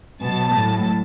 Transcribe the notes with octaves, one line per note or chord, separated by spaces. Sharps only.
B2 F#3 A5
A2 F#3